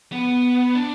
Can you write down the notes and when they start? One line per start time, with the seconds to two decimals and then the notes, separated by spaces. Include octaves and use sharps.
0.12 B3
0.75 D4